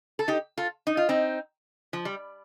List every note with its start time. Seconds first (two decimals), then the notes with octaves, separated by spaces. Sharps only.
0.19 A4
0.28 D#4 G4
0.57 F4 A4
0.87 D#4
0.97 F4
1.09 C4 D#4
1.93 F3
2.05 G3